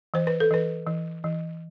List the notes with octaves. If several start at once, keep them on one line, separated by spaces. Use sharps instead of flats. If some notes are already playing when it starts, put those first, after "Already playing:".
E3 C5
B4
A4
E3 B4
E3
E3